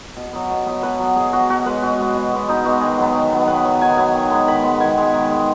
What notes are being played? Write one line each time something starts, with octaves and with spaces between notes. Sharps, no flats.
B2
F#3 B3
B2
F#3 B3
B2 B4
F#3 B3
B2 G#4
F#3 B3 F#4
B2 F#4
G#3 B3 B4
B2 F#4
G#3 B3
B2
G#3 B3
B2 D#4
G#3 B3 F#4
D#3 G#4
F#3 B3
D#3
F#3 B3
D#3 B4
F#3
B3
D#3 G#5
F#3 B3 G#5
D#3
G#3 B3
D#3 B5
G#3 B3
D#3 G#5
G#3 B3
D#3
G#3 B3